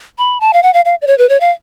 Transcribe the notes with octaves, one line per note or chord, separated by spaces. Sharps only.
B5
A5
F5
F#5
F5
F5
D5
C#5
B4
C#5
F5